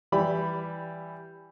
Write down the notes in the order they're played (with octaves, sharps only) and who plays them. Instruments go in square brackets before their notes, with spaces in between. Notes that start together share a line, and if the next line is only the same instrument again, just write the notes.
[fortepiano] E3 G3 B5